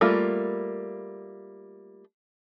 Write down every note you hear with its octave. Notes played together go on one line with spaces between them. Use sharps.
G3 A3 A#3 F4